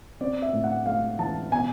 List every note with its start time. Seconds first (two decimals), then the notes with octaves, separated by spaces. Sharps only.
0.21 C4 D5
0.42 E5
0.53 A2
0.64 F#5
0.86 A3 F5
1.19 E3 A5
1.52 B2 G#5